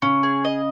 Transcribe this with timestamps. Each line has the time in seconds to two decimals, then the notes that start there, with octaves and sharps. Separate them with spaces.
0.02 C#3 C#4
0.23 G#4
0.45 D#5